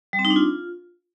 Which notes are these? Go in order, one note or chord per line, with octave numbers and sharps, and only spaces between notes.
G3
C4
D#4
D4
F4